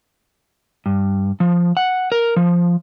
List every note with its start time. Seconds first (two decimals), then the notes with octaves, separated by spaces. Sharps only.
0.86 G2
1.40 F3
1.77 F#5
2.12 A#4
2.36 F3